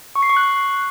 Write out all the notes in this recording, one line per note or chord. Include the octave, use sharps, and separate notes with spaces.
C#6
C7
C#6
F#6